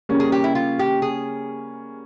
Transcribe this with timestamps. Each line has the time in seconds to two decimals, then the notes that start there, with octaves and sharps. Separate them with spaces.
0.09 C#3 G3 A#3 C#4
0.20 G#4
0.32 G4
0.44 E4
0.55 F4
0.79 G4
1.02 G#4